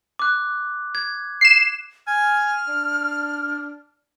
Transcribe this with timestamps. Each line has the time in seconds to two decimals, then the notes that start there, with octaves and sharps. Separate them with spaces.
0.19 D6 F#6
0.95 G#6
1.41 C7 E7
2.07 G#5 F6
2.68 D4